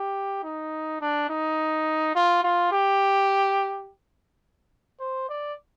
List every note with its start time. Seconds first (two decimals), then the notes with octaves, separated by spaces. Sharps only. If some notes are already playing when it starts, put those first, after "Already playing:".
Already playing: G4
0.44 D#4
1.01 D4
1.30 D#4
2.15 F4
2.44 F4
2.72 G4
5.00 C5
5.29 D5